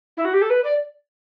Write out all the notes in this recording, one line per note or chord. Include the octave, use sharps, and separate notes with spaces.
E4
F#4
G4
A4
B4
D5